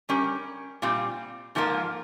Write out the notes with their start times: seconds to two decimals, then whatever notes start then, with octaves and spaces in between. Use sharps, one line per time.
0.09 G3 C#4 G4 A#4
0.82 A#2 G3 C4 F4
1.55 G#2 F3 A#3 F4 A#4